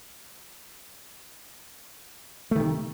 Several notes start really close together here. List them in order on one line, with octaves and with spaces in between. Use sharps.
A3 D#3 C3